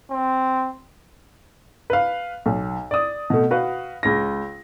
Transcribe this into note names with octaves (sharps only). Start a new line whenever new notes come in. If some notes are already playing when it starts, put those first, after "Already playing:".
C4
B4 F5
B1
D5 D#6
B2 A3
F#4 B4 F5 F#5
C#2 A#6